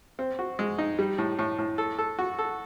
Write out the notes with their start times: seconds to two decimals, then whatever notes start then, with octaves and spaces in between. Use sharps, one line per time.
0.19 C4
0.39 F#4
0.59 G#3
0.78 D#4
0.99 G3
1.18 A2
1.39 A2
1.58 A2
1.78 A4
1.98 A4
2.19 F#4
2.39 A4